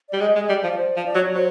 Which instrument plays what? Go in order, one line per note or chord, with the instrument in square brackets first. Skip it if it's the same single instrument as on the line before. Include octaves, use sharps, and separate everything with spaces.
[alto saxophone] G3 [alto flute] D5
[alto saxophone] G#3 [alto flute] D#5
[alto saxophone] G#3
[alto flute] D#5
[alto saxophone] G3 [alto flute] D5
[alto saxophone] F3
[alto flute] C5
[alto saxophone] F3
[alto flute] D5
[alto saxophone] F#3
[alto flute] C#5
[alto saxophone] F#3 [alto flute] C5